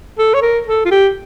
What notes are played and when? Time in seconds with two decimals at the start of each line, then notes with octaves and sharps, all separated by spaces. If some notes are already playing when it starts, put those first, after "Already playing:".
0.18 A4
0.34 C#5
0.42 A#4
0.67 A4
0.85 F4
0.91 G4